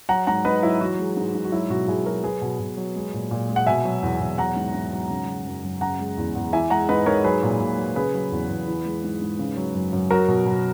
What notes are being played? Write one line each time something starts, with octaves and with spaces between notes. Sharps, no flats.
F#3 F#5 A#5
G#2 F#5 A#5
G#2 B4 D#5
F#3 E4
E3 F#4
G#3
G#2
G#2
F#4
F#3 E4
B2 F#4
B2 E4 G#4
F#3 F#4 A#4
F#3 G#4 B4
B2
B2
F#3
G#3
A#2
A#2
G#3
F#5
B2 E5 G#5
F#3
E2
E2
F#3 F#5 A#5
G#2
G#2
F#3
C#3
F#3
F#2
F#2
C#3 F#5 A#5
G#3
E2
E2
E3 E5 G#5
G#3 F#5 A#5
G#2 B4 D#5
G#2 A#4 C#5
F#3 G#4 B4
A#2
A#2
F#3
C#3 G#4 B4
F#3
E2
E2
E3
G#3
G#2
G#2
C#3
F#3
F#2
F#2
F#3 F#4 A#4
B2
B2